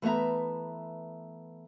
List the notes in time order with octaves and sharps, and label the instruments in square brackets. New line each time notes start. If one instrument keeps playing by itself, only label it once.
[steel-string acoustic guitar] E3 A3 B3 E5 A#5